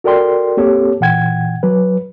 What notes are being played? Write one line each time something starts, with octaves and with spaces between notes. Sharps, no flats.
F#4 A4 A#4 D5 G5 C6
A#3 C4 G4 A4 C#5
A#2 E3 F#5 G5 G#6
F#3 B4